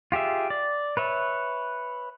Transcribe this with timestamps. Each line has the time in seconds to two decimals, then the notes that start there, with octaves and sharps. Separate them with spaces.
0.12 F4 G4 G#4 E5
0.50 D5
0.97 B4 C#5 E5